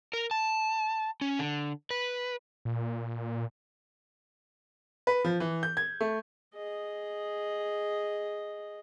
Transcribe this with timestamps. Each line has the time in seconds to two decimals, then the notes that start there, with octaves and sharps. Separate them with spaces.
0.13 A#4
0.31 A5
1.21 C#4
1.39 D3
1.91 B4
2.65 A#2
5.07 B4
5.24 F3
5.40 E3
5.63 G6
5.77 G#6
6.01 A3
6.54 G#4 D#5